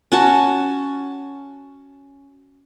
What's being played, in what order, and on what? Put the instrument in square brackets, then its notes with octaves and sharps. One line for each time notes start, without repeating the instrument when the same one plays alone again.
[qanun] C#4 F#4 A5